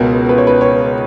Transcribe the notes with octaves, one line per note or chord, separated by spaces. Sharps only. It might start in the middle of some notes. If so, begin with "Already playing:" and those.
Already playing: C#2 B2 A#4
B4
C#5
B4
C#5